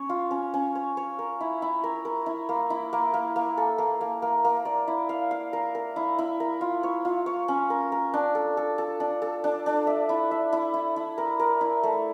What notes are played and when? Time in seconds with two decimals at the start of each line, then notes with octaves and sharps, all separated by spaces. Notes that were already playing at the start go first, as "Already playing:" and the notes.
Already playing: C#4 C#5
0.09 F4
0.31 C#4
0.54 C#4
0.75 C#5
0.97 C#5
1.19 A#4
1.41 E4
1.62 E4
1.84 A#4
2.05 A#4
2.26 E4
2.49 A#3
2.70 E4
2.93 A#3
3.14 A#3
3.36 A#3
3.57 A4
3.78 A#3
4.01 A#3
4.22 A#3
4.44 A#3
4.65 D5
4.88 E4
5.09 F5
5.31 F5
5.53 A#4
5.75 A#4
5.96 E4
6.19 E4
6.40 A#4
6.61 F4
6.83 C#5
7.05 F4
7.26 C#5
7.48 C#4
7.70 A#4
7.92 A#4
8.14 D4
8.35 A4
8.57 A4
8.78 A4
9.00 D4
9.22 A4
9.44 D4
9.66 D4
9.87 E5
10.09 E4
10.31 E5
10.53 E4
10.74 E4
10.96 E4
11.18 A#4
11.40 A#4
11.61 E4
11.83 A3